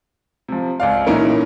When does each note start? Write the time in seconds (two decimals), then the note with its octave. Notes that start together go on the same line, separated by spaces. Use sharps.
0.48 C3 F3
0.80 C#2 D5 F5
1.06 A#2 E3 C#4 D#4 E4 A#4